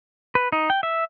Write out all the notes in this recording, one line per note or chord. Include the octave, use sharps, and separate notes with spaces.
B4
D#4
G5
E5